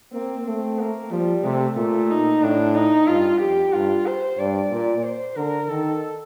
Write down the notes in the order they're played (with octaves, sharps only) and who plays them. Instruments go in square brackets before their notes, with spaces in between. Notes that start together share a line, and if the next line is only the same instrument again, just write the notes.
[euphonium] A#3 [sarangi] C4
[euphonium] A3 [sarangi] C4
[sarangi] A#3
[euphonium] F3 [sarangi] G3
[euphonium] C3 [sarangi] A3
[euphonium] A#2 [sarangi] A3
[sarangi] D#4
[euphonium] A2 [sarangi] D4
[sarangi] D#4
[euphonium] G2 [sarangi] F4
[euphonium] F2 [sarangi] G4
[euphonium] G2 [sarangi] F4
[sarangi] C5
[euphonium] G2 [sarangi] D5
[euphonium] A#2
[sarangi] C5
[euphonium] D3 [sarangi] A#4
[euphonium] D#3 [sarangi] A4